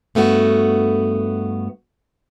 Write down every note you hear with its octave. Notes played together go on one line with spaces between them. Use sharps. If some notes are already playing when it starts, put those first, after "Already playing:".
G2 A3 B3 F#4